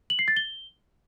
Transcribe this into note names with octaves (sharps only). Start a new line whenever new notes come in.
F#7
C7
A6
G7